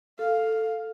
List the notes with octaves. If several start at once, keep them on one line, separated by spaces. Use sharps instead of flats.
A4 F5